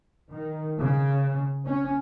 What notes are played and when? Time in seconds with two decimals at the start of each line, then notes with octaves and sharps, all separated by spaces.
0.32 D#3
0.80 C#3
1.66 C#4